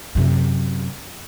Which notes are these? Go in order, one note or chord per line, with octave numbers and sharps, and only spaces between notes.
F#2 C3